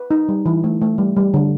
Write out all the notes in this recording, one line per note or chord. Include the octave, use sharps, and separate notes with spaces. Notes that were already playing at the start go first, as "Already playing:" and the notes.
Already playing: B4
D#4
G3
E3
A3
A3
G3
G3
D3